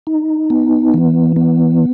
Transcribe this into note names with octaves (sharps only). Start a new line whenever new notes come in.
D#4
B3
E3
B3